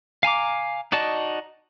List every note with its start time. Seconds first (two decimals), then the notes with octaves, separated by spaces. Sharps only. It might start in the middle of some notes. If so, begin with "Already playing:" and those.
0.23 F5 G#5 A#5 D6
0.92 D#4 F#4 D5 D#5 A5